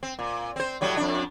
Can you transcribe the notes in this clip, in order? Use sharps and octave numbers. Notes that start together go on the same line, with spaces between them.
C4
A#2
C4 C5
A2 F#3 G3
F2 D4